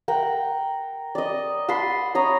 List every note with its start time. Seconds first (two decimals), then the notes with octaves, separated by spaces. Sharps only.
0.08 A#4 F#5 G5
1.15 D5 D#5
1.69 F#5 A5 B5 C6
2.15 C#5 A#5 D#6